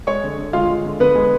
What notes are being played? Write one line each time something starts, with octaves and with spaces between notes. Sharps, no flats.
G#3 C#5 C#6
D3
D3
G#3 F4 F5
G#3
D3
D3 B3 B4
G#3